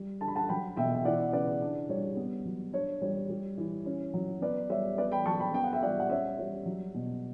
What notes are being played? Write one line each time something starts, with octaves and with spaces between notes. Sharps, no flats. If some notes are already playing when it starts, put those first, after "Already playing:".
Already playing: G3
D3 A5
B5
F#5 A5
F#3 G5 B5
B2 E5 G5
G5
E3 D5 F#5
C#3 B4 D5
D4
G3 C#5
B3
F#3
D4 C#5
G3 C#5
G3
E3
C#4
F#3
B3 B4 D5
G3 C#5 E5
B3 B4 D5
G5 B5
F#3 A5 C#6
G5 B5
B3 G5
F#5
E5 G5
G3 D5 F#5
F#5
C#4 C#5 E5
G3 C#5
F#3
B2